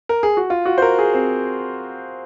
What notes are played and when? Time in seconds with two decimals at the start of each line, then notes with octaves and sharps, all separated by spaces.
0.09 A#4
0.23 G#4
0.37 F#4
0.50 F4
0.65 F#4
0.78 C5
0.82 A#4
0.99 G#4
1.14 C4